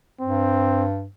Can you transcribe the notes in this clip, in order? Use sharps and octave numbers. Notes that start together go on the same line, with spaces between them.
G2 C4